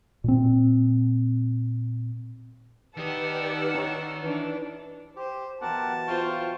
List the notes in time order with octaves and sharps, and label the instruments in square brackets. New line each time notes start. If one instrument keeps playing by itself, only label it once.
[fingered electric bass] A#2 C4
[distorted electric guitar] D#3 D#5 [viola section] G4 B4 D5 [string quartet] F#5 A5 E6
[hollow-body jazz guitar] D#4 C#5
[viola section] E3 [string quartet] D4
[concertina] G4 [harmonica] C5
[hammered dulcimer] B2 E3 F#3 [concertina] G4 A#4 F#5 [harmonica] A5
[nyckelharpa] F4 C5 [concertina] F5 G5 C#6